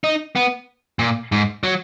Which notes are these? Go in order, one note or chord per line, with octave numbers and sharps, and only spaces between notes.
D#4
B3
A#2
G#2
F#3